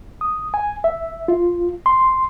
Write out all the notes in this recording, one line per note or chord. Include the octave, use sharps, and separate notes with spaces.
D#6
G#5
E5
F4
C6